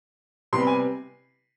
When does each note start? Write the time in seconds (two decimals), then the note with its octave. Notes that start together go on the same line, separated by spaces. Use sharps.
0.53 C3 G3 B3 C6
0.60 B5
0.67 G#5